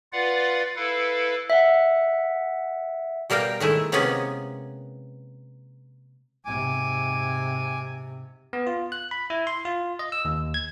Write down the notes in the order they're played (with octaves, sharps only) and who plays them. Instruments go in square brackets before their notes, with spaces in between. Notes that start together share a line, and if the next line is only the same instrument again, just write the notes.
[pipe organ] F4 B4 D5 F5 F#5
E4 A4 B4 F5
[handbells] E5 F#5
[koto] B2 G3 A#4 F5 G5
D#3 G#3 A3 E4
C3 G#3 A#3 B3 C#4 B4
[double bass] G#2 C3 [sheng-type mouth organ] G#5 D6
[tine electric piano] B3
F4
F#6
B5
E4
C6
F4
D#5
E6
D#2
G#6